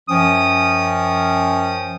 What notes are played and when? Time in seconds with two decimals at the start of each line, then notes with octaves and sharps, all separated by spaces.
0.09 F#2 F3 C#4 G5 D#6